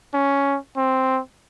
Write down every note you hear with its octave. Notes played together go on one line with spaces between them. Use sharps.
C#4
C4